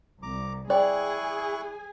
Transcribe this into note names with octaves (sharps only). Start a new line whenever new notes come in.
C2 A#5 D6
E4 G#4 C5 D5 G5 G#5 C#6 F#6